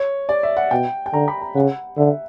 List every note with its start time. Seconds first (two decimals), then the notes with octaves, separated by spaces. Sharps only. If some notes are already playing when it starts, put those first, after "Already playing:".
Already playing: C#5
0.29 D5
0.43 E5
0.57 F#5
0.71 B2 G5
1.06 G5
1.13 D3 A#5
1.28 B5
1.41 A#5
1.55 C#3 F#5
1.98 D3 E5